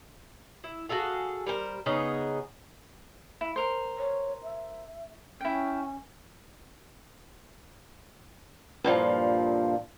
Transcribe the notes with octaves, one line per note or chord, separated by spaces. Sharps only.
E4
F#4 G#4 A4 F5
G3 A#4 C5
C#3 B3 D#4 G#4
E4
A#4 C5
C#5
E5
C#4 E4 G5
G2 A#2 F3